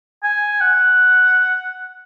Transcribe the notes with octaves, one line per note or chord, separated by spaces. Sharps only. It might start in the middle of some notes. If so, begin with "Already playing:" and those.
G#5
F#5